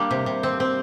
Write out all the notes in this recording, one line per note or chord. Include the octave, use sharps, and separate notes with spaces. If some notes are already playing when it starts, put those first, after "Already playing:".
Already playing: G3 A#3 D4
C3
C3
C4
C4